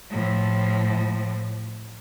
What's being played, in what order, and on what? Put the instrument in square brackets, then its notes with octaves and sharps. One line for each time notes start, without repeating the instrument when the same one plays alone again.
[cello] A2 F3